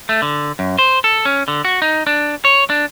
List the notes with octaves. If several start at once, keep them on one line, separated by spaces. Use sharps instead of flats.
A3
D3
F#2
C5
A4
C#4
D3
F#4
D#4
D4
C#5
D4